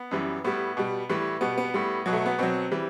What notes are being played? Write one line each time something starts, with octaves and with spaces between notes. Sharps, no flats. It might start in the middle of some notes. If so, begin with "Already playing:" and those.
Already playing: B3
F#2 E3 G3
A2 G3 B3
B2 G3
A2 E3 G3
B2 G3 B3
B3
A2 G3
B2 F#3
A3
B3
B2 F#3 C4
E3 G3